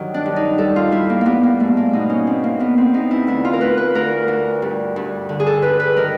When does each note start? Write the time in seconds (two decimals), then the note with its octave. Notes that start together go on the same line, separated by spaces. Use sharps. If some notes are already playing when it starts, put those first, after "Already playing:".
Already playing: G2 D#3 F#3
0.14 D4
0.26 G2
0.36 D#4
0.58 G3 A4
0.76 F4
0.92 G3 E4
1.10 A#3
1.21 G3 A#3 B3
1.43 A#3
1.60 G#2 A3
1.77 A#3
1.93 B2 D#4
2.10 C#4
2.27 E2 C4
2.44 A#3
2.59 E2 B3
2.78 C4
2.94 E2 D#4
3.11 E4
3.27 D2 E4
3.45 F4
3.53 A#4
3.61 D2 B4
3.77 B4
3.95 D2 A#4
4.28 D2
4.62 G2
4.96 G2
5.29 D3
5.40 G#4
5.47 A4
5.62 G2 B4
5.79 B4
5.97 D#3 A#4